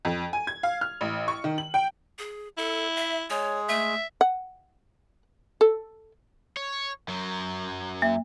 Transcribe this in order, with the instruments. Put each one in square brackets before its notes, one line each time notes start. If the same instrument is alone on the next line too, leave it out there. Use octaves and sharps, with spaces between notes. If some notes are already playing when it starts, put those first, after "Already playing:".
[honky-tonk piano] F2
G#5
G#6
F5
F6
A1
C#6
D#3
F#7
G5
[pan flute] G#4
[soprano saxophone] E4 [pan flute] A4
[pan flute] E5
[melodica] G#3 G#4 [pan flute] C#5
[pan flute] A3 [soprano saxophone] E5
[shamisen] F#5
A4
[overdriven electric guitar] C#5
F#2 F#3
[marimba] A#3 [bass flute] E5